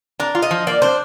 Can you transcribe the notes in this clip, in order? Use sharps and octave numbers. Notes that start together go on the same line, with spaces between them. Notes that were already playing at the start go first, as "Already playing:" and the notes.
D4 A#4
F4
D#5
F3
A#3 D5
D4 C5